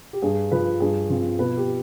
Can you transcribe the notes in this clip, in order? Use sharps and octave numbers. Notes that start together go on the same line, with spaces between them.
G4
G2 G#4
F3 B4
G2 G#4
F3 C4
B2 B4
G4